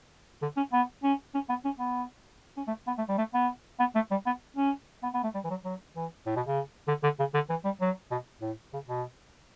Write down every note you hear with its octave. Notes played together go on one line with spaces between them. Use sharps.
D3
C#4
B3
C#4
C#4
B3
C#4
B3
C#4
A3
B3
A3
G3
A3
B3
B3
A3
G3
B3
C#4
B3
B3
A3
G3
E3
F#3
F#3
E3
A2
B2
C#3
D3
D3
C#3
D3
E3
G3
F#3
B2
A2
C#3
B2